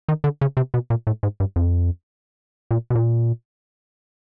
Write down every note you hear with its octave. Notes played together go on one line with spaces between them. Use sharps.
D#3
D3
C#3
C3
B2
A#2
A2
G#2
G2
F2
A#2
B2
A#2